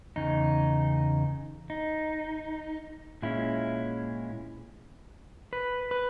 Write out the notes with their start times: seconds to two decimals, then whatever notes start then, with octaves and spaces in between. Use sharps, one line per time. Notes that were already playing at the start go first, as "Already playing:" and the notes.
0.16 E2 C#3 D#4
1.70 D#4
3.22 A#2 G#3 C#4 E4
5.53 B4
5.91 B4